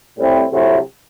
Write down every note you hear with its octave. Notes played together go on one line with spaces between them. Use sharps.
A2 G3 C4 E4
C3 F#3 A3 C4 E4